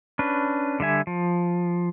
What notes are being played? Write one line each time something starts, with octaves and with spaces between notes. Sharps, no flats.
C#4 D4 B4
D3 G3 E5 G#5
F3